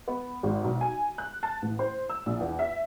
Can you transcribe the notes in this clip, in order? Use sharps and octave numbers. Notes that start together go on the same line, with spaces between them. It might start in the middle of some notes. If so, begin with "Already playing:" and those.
B3
G#1
B1
G#5
F#6
A5
A1
C5
E6
A#1
E2
E5